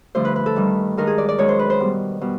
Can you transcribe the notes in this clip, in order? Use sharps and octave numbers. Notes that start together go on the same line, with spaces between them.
G2 D3 F3 A3 C5
B4
B4
A4
G2 D#3 G3
G2 D#3 G#3 A#4
G#4
D5
D5
F#2 D#3 G#3 C#5
C5
B4
C5
B2 G3
B2 G3